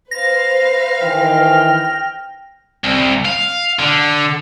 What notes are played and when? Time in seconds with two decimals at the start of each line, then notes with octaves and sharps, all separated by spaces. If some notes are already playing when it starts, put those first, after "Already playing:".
0.11 B4 C5 F5 A#6
1.02 D#3 E3 G5 F6
2.84 C2
3.25 F5
3.79 D3